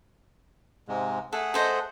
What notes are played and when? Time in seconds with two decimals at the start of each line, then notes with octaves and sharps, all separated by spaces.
0.88 G#2 C3 G#3
1.33 A3 G#4 A4 F#5
1.54 A4 C5 D#5